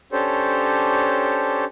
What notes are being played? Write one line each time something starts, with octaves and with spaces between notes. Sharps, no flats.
C#4 D4 G4 A4 C5 C#5